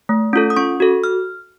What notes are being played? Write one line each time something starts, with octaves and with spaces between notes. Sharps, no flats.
A3
C#4 F4 A4
D#6
C#4 C#6
F#4 A4
F6